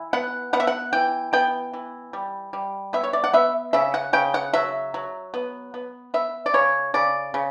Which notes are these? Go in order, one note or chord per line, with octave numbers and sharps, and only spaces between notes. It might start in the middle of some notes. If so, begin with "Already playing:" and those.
Already playing: E3
B3 F#5
B3 F#5
E5
F#5
E3 G5
B3 G5
E3
G3
G3
B3 E5
C#5
D5
F#5
B3 E5
C#3 E5
F#5
C#3 G5
F#5
F#3 E5
F#3
B3
B3
B3 E5
D5
C#3 C#5
C#3 D5
C#3